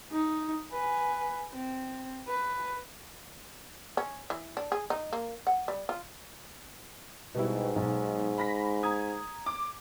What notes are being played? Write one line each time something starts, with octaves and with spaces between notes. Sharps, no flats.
D#4
B4 G#5
C4
B4
C#4
E3
D4
G#4
D#4
A#3
F#5
G3
F4
G#2 B2 G3 E4
B1
B5 A#6 B6
A#5 D#6 G#6
D6